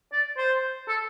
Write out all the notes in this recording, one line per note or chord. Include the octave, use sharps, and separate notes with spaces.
D5
C5
A4